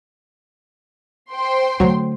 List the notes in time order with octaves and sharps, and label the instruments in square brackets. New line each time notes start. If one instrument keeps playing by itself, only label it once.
[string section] C5 G5 C6
[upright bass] D3 A3 [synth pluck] F#3